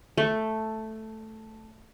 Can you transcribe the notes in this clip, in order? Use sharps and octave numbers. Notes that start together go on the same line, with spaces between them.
A3